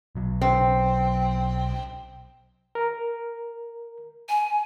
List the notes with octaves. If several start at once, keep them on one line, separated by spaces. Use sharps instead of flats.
B1 F#3
C4
A#4
G#5